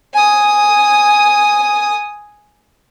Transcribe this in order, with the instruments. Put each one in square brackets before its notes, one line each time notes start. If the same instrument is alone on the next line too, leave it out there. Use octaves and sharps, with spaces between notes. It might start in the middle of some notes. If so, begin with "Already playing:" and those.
[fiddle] G#5 D#6